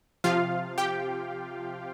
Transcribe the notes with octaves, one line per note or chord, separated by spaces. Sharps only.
C3 F3 F4 F5
G4 G5